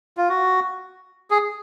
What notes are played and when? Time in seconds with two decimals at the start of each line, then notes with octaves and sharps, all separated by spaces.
0.17 F4
0.29 F#4
1.30 G#4